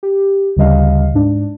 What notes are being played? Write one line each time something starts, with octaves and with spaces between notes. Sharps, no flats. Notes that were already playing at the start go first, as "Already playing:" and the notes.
G4
D2 C#3 G3 D#5 F5
G#2 D4